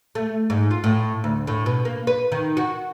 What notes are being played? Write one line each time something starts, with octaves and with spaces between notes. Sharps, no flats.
A3
G#2
F4
A2
D2
A2
B2
A#3
B4
D#3
F#4